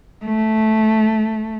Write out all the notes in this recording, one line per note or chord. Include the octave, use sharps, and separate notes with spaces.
A3